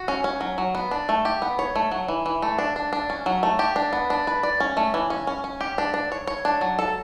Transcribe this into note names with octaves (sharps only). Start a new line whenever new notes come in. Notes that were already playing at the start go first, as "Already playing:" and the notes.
Already playing: F#4
C#4
C#4
F#3
F#3
B3
D4
A3
G4
B3
C#5
A3
F#3
E3
E3
A3
D4
D4
D4
C#4
F#3
A3
G4
D4
B3
D4
B4
D5
C#4
A3
E3
C#4
C#4
C#4
G4
D4
D4
C#5
C#5
D4
F#3
A4